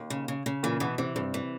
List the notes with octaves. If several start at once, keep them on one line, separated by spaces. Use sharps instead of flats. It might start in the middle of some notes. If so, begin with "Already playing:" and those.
Already playing: D#2
C#3
C#3
C#3
A#2 E3 A#3
B2 E3 B3
C3 E3 C4
G2 C3 C4
E3